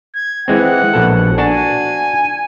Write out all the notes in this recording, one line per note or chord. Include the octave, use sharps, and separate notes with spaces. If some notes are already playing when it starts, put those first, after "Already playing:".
G#6
E3 G#3 C4 F#5
A#1 B2 A4
D4 F#4 G#5 A5